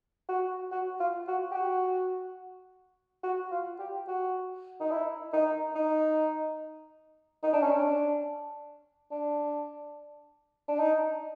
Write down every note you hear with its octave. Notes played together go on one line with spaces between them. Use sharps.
F#4
F#4
F4
F#4
G4
F#4
F#4
F4
G4
F#4
D#4
E4
D#4
D#4
D#4
D4
C#4
D4
D4
D4
D#4